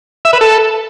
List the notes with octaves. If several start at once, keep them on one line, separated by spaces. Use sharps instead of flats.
E5
B4
A4